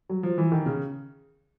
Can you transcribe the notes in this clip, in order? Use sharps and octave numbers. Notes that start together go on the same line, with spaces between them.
F#3
F3
E3
D#3
C#3